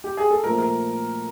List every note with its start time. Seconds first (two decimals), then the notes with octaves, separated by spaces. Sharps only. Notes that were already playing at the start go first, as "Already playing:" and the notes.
0.04 G4
0.17 G#4
0.31 A4
0.44 A#2 F3 A3 A#4
0.58 A#4